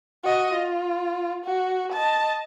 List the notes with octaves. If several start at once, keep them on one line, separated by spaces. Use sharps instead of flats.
F#4 D#5
F4
F#4
D#5 A5